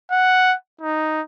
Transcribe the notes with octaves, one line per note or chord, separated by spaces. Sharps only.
F#5
D#4